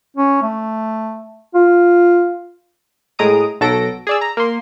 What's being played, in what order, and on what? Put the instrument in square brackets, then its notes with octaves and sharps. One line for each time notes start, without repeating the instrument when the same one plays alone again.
[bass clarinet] C#4
A3
F4
[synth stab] A2 G#3 A#5 D#6 D7
B1 F#3 A4 A#6 D7
G#4 D5 E6
A#5
A#3 C6